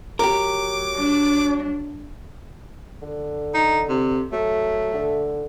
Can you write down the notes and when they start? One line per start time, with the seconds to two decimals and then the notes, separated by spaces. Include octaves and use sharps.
0.19 F#3 G4 A#4 D6
0.94 D4
3.02 D3
3.54 D#4
3.89 C3
4.32 F#3 A3
4.94 D3